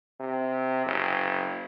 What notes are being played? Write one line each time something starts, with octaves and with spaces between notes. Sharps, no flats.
C3
F#1